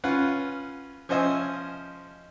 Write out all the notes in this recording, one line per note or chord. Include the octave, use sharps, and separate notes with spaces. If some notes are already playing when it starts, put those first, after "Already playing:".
C#4 F4 B4 F#5
F3 C#4 C5 D#5 E5 G#5